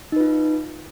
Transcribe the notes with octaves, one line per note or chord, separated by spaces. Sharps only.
D#4 F4 B4